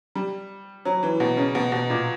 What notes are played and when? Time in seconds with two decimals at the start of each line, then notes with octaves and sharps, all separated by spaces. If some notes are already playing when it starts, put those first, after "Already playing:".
0.15 G3
0.85 F#3
1.03 E3
1.20 B2
1.37 C#3
1.55 B2
1.72 B2
1.90 A#2